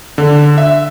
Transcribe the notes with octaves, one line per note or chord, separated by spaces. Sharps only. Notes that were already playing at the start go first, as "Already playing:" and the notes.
D3
E5